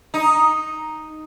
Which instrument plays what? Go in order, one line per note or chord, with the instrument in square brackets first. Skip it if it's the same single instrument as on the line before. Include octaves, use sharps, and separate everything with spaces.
[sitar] D#4